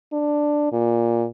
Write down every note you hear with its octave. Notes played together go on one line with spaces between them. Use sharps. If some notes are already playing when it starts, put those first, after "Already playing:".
D4
A#2